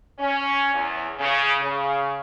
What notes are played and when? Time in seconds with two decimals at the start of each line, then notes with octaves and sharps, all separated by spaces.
0.19 C#4
0.74 E2
1.19 C#3
1.61 C#3